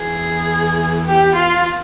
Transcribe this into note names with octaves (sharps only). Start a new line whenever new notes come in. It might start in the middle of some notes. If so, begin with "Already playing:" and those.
Already playing: E2 E3 G#4
G4
F4